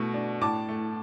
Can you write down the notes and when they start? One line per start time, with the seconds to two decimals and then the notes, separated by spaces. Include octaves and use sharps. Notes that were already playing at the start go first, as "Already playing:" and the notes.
Already playing: B2 A3
0.14 D4
0.41 A2 A5 D6
0.69 A3